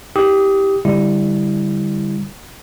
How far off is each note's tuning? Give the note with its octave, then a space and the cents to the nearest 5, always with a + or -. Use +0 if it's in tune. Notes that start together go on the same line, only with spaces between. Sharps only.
E4 -35 G4 +0 D#6 +20
D3 +0 G3 +15 E4 -5